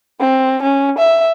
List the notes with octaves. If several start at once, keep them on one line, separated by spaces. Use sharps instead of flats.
C4
C#4
E5